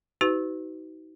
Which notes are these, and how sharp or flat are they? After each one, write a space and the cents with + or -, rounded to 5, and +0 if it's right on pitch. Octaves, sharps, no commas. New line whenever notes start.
D#4 +35 F#4 +35 B4 +35